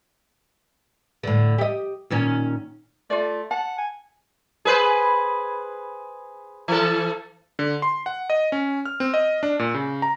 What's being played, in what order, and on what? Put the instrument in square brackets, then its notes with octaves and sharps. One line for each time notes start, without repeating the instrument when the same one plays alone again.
[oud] A2 D3
G4 D#5
A#2 D#3 C#4
[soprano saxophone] A3 [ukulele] F4 D5
[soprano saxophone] F#5 [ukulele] A5
[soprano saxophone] G#5
[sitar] G#4 B4 C5
E3 A4
[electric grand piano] D3
C6
F#5
D#5
C#4
F6
C4
D#5
D4
A#2
C#3
A#5